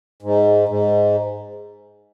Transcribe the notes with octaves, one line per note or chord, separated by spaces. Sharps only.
G#2
G#2